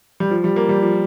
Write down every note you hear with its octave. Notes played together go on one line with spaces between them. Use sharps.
G3
F3
G3
A#3
G3
F3